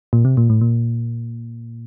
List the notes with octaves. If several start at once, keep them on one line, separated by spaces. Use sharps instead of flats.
A#2
C3
A#2
A2
A#2